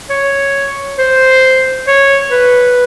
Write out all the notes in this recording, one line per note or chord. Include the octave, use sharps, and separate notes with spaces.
C#5
C5
C#5
B4